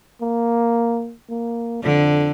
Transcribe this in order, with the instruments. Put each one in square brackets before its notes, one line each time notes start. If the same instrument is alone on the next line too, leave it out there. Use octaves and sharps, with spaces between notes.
[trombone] A#3
A#3
[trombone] F2 [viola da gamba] D3